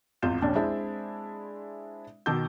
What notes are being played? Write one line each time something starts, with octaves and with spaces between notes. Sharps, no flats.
G#1 E2 F4 G6 E7
A#1 D#2 C#4 D4
G#3 C4 D4 E4 G#4 E5
B2 D#3 A5 D6 E6 G6